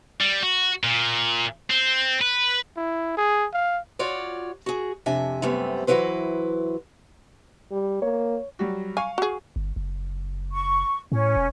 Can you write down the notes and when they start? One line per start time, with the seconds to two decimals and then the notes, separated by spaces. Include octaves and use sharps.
0.21 G3
0.43 F#4
0.83 A#2
1.70 C4
2.21 B4
2.77 E4
3.18 G#4
3.53 F5
3.99 F4 F#4 C#5 D5
4.66 F#4 G#4
5.06 F2 C3 D4 E5 G#5
5.42 F#2 C3 G3 A3 B3 C4
5.87 E3 F#3 G3 E4 B4 C5
7.71 G3
8.02 A#3 C#5
8.59 F#3 G3 F#4
8.97 F5 G#5 C#6
9.18 F#4 G#4
9.56 G1
9.76 F#1
10.52 C#6
11.12 A2 C#4
11.36 E1